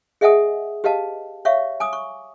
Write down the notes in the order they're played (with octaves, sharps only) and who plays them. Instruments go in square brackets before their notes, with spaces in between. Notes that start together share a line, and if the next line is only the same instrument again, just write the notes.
[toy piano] G#4 D#5 E5 F#5 G#5 D#6
G4 B4 D#5 F5 A5
C#5 E5 F5 C#6
G#5 D6 D#6
C#6